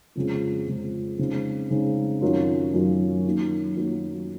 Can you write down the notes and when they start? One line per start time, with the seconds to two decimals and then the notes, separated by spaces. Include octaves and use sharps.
0.15 F2 C#3 G#3 C4
0.67 F2 C#3 G#3 C4
1.18 C#3 G#3 C4 D#4
1.70 C#3 G#3 C4 D#4
2.21 F#2 D#3 F#3 C#4 F4
2.73 F#2 D#3 F#3 C#4 F4
3.25 D#3 F#3 A#3 D#4
3.77 D#3 F#3 A#3 D#4